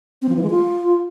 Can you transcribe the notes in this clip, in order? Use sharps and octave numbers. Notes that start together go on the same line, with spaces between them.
C4
F3
E3
G#3
F4